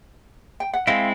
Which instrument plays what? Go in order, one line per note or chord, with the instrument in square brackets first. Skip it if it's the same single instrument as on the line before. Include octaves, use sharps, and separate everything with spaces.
[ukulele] G5
F#5
[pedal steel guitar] G#3 C4 E4 [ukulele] D#5 F5